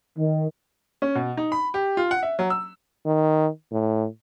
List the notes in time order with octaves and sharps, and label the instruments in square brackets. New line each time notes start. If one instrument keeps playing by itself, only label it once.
[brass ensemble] D#3
[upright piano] C#4
B2
D#4
B5
G4
F4
F#5
E5
F#3
E6
[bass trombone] D#3
A2